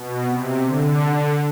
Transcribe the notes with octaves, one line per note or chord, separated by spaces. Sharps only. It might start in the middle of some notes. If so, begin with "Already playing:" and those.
Already playing: B2
C3
D3